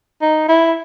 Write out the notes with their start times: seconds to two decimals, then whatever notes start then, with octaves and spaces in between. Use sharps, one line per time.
0.21 D#4
0.48 E4